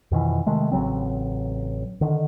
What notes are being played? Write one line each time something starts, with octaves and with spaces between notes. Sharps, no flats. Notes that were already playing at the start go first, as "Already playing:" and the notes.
F2 B2 D#3 E3
C3 D#3 G#3 A3
A1 C#3 F#3 C4
D3 D#3